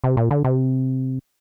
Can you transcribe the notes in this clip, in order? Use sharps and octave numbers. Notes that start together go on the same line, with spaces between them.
C3
A#2
D3
C3